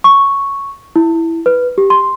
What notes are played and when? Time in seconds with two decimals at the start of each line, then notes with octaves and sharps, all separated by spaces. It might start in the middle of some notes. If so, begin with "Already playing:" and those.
0.04 C#6
0.96 E4
1.46 B4
1.78 G4
1.90 C6